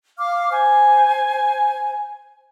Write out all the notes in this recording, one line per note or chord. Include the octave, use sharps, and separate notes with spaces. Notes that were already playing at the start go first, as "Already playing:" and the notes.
F5 D6 F6
C5 G#5